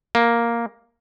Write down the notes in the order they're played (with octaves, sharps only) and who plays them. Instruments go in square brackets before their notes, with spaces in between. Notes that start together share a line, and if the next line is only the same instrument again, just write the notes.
[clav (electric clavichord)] A#3